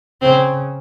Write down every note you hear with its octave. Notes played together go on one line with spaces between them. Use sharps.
C#3 C4